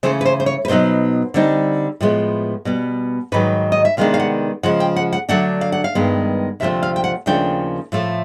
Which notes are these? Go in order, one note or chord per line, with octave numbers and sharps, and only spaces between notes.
C#3 E3 A3 C#4 C5
B4
C5
C5
C#5
B4
B2 F#3 B3 D#4 C5
D3 G3 C4 D#4
A2 F3 G#3 B3
B2 G3 B3
G#2 D#3 F#3 B4
D#5
E5
C3 D#3 G#3 B3 D4 F5
F5
F#5
C#3 F3 G#3 F#5
G5
F#5
F#5
D3 F#3 A3 D4 F#5
F5
F#5
F5
G2 D#3 G#3 B3
D2 C3 F3 A3 C4 E5
F5
G5
F#5
D#2 C#3 F3 A3 D4 G5
A2 F3 A3